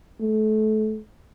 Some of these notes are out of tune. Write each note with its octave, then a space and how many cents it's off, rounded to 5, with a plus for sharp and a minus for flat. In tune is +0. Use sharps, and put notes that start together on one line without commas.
A3 -30